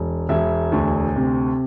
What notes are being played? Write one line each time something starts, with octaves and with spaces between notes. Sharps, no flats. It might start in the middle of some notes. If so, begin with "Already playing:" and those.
Already playing: E1
E1 E5
D2
C3